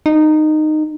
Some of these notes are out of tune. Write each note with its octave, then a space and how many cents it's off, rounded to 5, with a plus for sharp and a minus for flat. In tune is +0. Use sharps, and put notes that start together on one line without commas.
D#4 -15